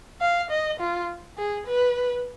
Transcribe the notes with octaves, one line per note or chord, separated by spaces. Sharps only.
F5
D#5
F4
G#4
B4